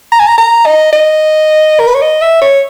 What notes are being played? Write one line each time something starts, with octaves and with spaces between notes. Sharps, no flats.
A#5
G#5
A#5
A#5
D#5
D#5
A#4
B4
C#5
D#5
E5
C#5